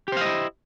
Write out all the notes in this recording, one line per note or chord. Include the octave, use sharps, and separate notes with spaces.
E4 G4 C5 D#5 F5